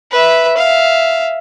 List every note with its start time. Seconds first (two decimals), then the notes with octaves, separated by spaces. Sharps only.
0.12 B4 E5
0.57 E5 F5